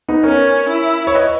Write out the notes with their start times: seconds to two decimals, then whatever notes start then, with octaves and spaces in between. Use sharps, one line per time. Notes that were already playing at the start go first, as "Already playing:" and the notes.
0.08 B3 D#4
0.23 C#4 A#4 C#5
0.69 E4
1.07 C#5
1.14 B4 D#5